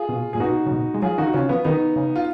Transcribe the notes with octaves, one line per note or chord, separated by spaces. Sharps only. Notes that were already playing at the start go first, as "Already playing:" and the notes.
Already playing: F4 G#4
B2
A#2 G#4
B2 D#4 F#4
C#3
B2
G#3
F#3 F4 G#4
D#3 D#4 F#4
C#3 C#4 F4
F3 B3
D#3 B3 D#4
C#3
F4